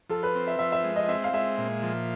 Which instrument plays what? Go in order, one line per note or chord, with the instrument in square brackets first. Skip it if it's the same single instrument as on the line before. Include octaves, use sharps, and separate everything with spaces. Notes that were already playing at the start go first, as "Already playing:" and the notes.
[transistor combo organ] F3 [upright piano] A4
[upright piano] B4
[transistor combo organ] C4
[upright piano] E5
[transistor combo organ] F3 [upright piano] E5
[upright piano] E5
[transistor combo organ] G#3
[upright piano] D#5
[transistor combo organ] C4 [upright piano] E5
[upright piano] F5
[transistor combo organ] G#3 [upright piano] E5
[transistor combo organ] A#2
F3